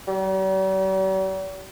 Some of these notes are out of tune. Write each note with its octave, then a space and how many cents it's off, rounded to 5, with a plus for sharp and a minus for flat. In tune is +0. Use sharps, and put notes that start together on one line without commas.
G3 -45